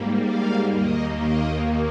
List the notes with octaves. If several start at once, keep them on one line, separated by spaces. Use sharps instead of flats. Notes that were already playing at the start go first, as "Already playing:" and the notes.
Already playing: G#2 G3 A#3
F5
D#2 D#3 A#3 D#5
D#5